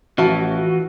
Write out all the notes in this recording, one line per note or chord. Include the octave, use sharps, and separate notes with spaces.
A1 E3 F3 F#4 E5 A5